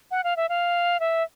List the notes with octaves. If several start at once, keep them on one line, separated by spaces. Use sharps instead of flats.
F#5
F5
E5
F5
E5